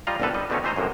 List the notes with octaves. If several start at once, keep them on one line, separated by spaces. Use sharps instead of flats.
G3 F4 D#5 F5 A#5
G1 C2 D3 G3 A4 B4
G3 D#5
B2 D3 A3 C4 C#4 D#4
E3 A3 C5 D#5 A#5
F#2 A2 C3 A#3